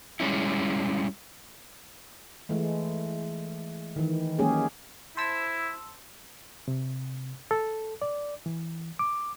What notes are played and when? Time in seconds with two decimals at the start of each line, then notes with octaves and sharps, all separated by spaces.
0.20 G3 G#3 C#4 E4
2.49 E3 G#3 A3
3.96 D#3 E3
4.38 F#3 G#3 A#3 C#4 G4 G#4
5.17 E4 C5 A5 E6
6.68 C3
7.51 A4
8.02 D5
8.46 E3
8.99 D6